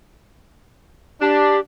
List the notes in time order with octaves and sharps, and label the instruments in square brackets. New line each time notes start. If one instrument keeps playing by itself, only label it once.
[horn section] D4 [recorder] G4